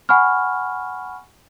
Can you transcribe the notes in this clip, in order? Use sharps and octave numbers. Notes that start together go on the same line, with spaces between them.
F#5 G#5 B5 C#6 F6